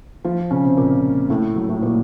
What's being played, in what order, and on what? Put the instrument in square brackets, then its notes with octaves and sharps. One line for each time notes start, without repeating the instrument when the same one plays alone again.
[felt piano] F3 F4
C#3 C#4
C3 C4
A#2 A#3
A2 A3
F#3
A2 A3
A#2 A#3